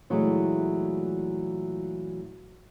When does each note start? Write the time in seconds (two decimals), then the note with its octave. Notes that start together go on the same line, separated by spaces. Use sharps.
0.10 A#2 E3 F#3 G#3 A3